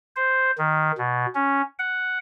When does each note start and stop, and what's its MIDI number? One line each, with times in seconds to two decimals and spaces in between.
0.16 0.51 72
0.59 0.92 51
0.98 1.26 47
1.35 1.62 61
1.79 2.18 78